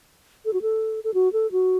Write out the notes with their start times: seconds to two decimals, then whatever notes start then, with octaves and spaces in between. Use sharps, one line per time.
0.45 A4
0.53 F#4
0.62 A4
1.04 A4
1.14 F#4
1.33 A4
1.52 F#4